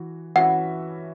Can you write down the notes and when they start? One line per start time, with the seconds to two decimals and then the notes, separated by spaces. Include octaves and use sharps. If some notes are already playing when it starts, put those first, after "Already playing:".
Already playing: E3 F#4
0.36 E3 C#4 F#4 B4 E5 F#5